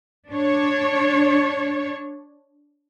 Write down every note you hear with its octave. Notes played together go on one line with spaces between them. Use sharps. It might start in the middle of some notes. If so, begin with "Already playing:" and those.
D4 C#5